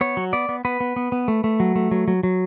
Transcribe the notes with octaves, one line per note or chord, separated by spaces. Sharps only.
B3 C#5
F#3
B3 D5
B3
B3 B4
B3
B3
B3
A3
A3
F#3
A3
F#3
F#3
F#3